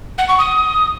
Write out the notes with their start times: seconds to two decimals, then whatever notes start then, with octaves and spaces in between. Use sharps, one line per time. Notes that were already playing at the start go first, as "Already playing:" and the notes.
0.18 F#5
0.28 C#6
0.39 D#6